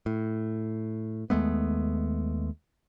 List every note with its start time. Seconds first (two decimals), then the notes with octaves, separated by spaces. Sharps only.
0.06 A2
1.30 D#2 G#3 A3 B3